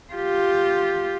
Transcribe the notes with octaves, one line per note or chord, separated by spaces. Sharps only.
F4 G4